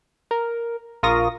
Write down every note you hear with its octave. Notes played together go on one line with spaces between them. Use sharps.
A#4
A#1 F4 A#4 C#6 D#6 A#6